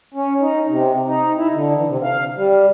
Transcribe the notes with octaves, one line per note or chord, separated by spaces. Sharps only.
C#4
D#4
C3
D#4
E4
D3
E3
C3
F5
G3